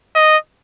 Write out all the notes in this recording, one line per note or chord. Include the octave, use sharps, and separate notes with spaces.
D#5